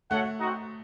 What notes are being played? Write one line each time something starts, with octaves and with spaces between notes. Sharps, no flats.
A3 F#4 A4 C#5 F#5
C4 D#4 F#4